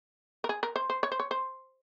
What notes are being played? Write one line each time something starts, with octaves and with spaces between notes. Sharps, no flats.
A#4
G#4
A#4
C5
C5
C#5
C5
C#5
C5